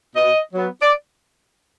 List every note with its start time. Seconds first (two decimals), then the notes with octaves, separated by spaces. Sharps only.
0.16 B2 D#5
0.53 F#3 B3
0.82 D5